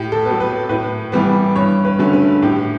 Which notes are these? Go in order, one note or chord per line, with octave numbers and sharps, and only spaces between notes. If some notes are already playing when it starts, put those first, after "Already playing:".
Already playing: A2 G4
A4
B3
F#3
B4
A2 B4
E3 G3 B3
G2 C#5
B4
D3 F#3 A3 C#4
B4
A2 G4